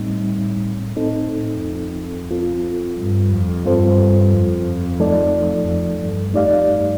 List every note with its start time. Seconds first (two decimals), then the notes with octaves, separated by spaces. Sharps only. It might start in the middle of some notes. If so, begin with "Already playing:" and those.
Already playing: A2 G3 C4 D#4
0.96 A2 C4 D#4 A4
1.30 A2
1.63 F2
2.31 C4 F4 A4
2.98 G2
3.31 F2
3.65 G2 C4 F4 A4 C5
4.32 F2
5.00 F3 A3 D#4 A4 D5
5.66 F2
6.00 G2
6.33 F2 A3 D#4 G4 D5 F5
6.67 G2